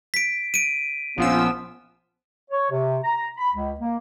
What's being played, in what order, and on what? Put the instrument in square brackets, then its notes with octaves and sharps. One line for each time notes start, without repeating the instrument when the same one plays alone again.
[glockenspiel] B6 D7
D7 D#7
[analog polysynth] A#1 F3 E6 [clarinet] B3 [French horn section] C#4 F4
[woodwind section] C#5
C3
A#5
B5
C#2
A#3